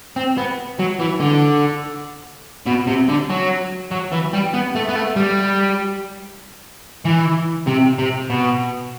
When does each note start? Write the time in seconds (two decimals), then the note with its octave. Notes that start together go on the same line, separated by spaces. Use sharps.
0.16 C4
0.38 B3
0.79 F#3
0.99 E3
1.20 D3
2.66 B2
2.87 C3
3.09 D3
3.29 F#3
3.91 F#3
4.12 E3
4.33 G3
4.54 B3
4.75 A3
4.89 B3
4.96 A3
5.16 G3
7.05 E3
7.67 C3
7.99 C3
8.30 B2